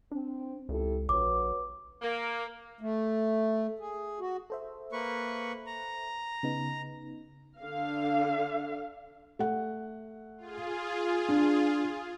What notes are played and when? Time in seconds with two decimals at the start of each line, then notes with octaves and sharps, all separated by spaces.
0.11 C4 D4
0.69 C#2 E4 G4 A4
1.09 A#1 F#4 B4 C#5 D6
2.02 A#3
2.81 A3
3.79 G#4
4.20 F#4
4.50 A4 C5 E5
4.92 A#3 B4 C#6
5.66 A#5
6.43 C#3 B3 D#4
7.59 D3 F5
9.39 A3 F#5
10.38 F4 G#4
11.29 D4